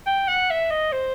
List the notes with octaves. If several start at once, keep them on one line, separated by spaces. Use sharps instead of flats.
G5
F#5
E5
D#5
C5